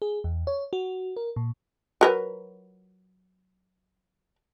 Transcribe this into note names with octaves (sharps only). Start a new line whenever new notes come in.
G#4
E2
C#5
F#4
A#4
A#2
F#3 A#4 B4